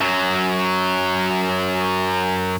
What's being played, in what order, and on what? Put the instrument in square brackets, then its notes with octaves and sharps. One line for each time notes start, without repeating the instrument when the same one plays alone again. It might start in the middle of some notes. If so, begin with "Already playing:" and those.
[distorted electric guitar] F#2 F#3